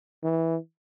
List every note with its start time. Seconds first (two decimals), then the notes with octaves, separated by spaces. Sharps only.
0.23 E3